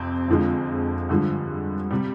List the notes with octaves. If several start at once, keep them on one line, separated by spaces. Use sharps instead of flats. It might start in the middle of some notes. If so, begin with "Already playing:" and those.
Already playing: F2 C3 C4
F2 D3 F3 G#3
G2 D3 F3 G#3
C3 G3